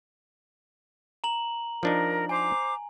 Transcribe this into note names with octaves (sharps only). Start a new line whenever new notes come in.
A#5 F#7
F3 D4 D#4 A#4
C5 G#5 A#5 D6